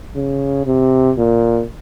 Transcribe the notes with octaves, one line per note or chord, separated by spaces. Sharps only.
C#3
C3
A#2